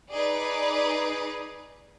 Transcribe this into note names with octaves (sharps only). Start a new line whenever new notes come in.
D#4 G#4 B4 D5